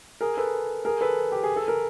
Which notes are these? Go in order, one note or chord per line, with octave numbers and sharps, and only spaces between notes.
G#4 A#4
A4 B4
G#4 A#4
A4 B4
G4
G#4
A4
A#4